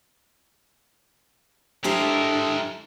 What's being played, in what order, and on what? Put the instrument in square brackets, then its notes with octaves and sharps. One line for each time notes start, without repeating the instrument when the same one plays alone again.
[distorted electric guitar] G#3 A#4 [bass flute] D4 [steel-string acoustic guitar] E4 G4 C5 [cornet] A4